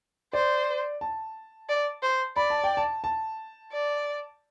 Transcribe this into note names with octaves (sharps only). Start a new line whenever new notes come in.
C5 D5
A5
D5
C5
D5 B5
A5
G5
A5
A5
D5